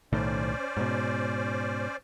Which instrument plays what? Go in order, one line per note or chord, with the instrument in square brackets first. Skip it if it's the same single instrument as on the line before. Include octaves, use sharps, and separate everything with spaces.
[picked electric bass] B1 A2 D#3 [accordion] C#4 C5 D5
[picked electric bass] G#2 B2